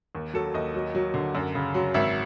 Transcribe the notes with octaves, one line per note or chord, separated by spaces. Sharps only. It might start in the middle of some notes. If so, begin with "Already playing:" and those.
D#2
F#3 A4
D#2 D#5
F#3
F#3
D3
F#2
C#3
F#3
G#1 E5